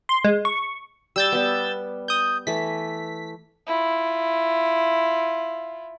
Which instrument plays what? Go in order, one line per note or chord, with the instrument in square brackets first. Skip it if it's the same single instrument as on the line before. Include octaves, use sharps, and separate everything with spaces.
[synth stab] C6
G#3
C#6
[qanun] G3 [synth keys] E6 G6 A6
[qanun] G3 B3
[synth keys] D#6 G6
[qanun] E3 A3 [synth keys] B6
[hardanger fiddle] E4 F4